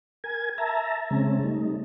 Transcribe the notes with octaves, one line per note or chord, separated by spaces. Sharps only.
A#4 G#5 G#6
E5 A5 A#5
C#3 G#3 C4 C#4
G3 A3 D#4